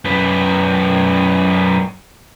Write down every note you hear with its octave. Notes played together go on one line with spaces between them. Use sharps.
F#2 B3